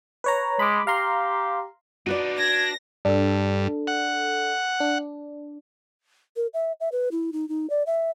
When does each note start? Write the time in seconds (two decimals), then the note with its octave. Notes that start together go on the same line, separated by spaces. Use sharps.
0.24 B4 C#5 A#5
0.59 G#3 B5 D6
0.87 G4 F5 A#5 C6
2.06 D4 D#4 F#4 B4 D5
2.39 D4 G#6 A#6
3.05 G2 D4 A4
3.87 F#5
4.80 D4
6.36 A#4
6.54 E5
6.80 E5
6.92 B4
7.11 E4
7.33 D#4
7.49 D#4
7.70 D5
7.86 E5